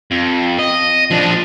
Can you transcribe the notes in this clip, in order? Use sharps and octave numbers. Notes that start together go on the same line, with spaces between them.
F2
D#5
F3 D4